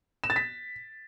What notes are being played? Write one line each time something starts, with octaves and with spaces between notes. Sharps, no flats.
E7
A6
B6